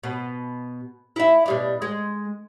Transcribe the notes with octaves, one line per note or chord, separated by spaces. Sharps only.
B2
E4 E5
B2 G3 D4
G#3